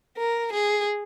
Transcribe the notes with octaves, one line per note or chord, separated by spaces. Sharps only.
A#4
G#4